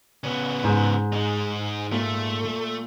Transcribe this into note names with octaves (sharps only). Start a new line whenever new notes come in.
C#3 B3
G#2
G#3 D#4
A#2 A3